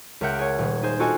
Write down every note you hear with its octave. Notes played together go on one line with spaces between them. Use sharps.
C#2 A#4 E5 F#5 G6 D7
G#4 C#5
D#1
D#4 G#4 C5
D4 F4 F#4 A4 D#5 G#5